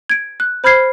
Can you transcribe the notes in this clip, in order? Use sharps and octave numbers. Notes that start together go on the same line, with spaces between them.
G#6 D7
F#6
C5 B5 F6 G#6 C7